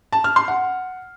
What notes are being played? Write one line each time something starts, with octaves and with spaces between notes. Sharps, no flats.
A5
F6
C6
F#5